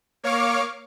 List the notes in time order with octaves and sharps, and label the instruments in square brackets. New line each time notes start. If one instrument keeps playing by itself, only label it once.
[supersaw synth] A#3 C#5 F5 C#6 D6 F6